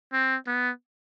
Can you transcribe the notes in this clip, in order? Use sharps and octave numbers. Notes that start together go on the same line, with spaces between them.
C4
B3